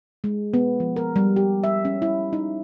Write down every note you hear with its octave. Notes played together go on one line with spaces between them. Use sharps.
G#3
B3
F3
A#4
G3
G4
E5
C#4
E4
D#4